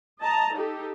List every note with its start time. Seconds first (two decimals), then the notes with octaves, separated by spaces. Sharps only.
0.21 D#5 A5 A#5
0.55 D#4 G4 A4